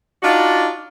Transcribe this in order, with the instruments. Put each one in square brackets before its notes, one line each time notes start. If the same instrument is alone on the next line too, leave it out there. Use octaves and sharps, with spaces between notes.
[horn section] D4 D#4 F4 F#4 D5